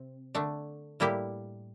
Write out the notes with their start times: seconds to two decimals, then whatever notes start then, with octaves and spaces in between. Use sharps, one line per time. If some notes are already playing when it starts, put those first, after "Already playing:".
Already playing: C3 C4
0.35 D3 A3 D4
1.00 A2 G3 A#3 E4 G4